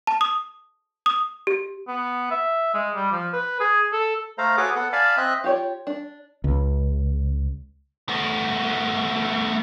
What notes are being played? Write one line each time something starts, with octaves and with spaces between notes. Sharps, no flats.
A5
D#6
D#6
G4
B3
E5
G#3
G3
F3
B4
G#4
A4
A3 A4 C5 F5 A#5
F#4 G#4 A4 B4 C#5 D6
B3 A4 F#5
D5 F5 G#5 A5 B5
C4 D#5 E5 F#6
F4 G4 C#5 D5
D4
C#2
A3 B3